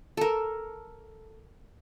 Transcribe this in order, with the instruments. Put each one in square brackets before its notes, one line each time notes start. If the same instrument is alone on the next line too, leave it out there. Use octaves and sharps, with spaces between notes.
[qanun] A4 A#4